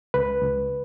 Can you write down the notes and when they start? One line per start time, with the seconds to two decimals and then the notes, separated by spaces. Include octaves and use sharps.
0.14 C#2 B4
0.42 C#2